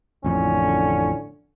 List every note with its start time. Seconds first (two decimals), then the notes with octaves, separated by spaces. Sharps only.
0.24 A1 F2 A2 D3 C#4